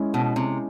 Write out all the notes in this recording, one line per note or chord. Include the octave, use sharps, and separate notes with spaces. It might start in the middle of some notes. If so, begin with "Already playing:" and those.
Already playing: G#3 C#4 E4
B2
C3